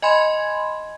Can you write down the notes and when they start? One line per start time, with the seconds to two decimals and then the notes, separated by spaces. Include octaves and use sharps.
0.02 D#5 G#5 B5 C6 G#6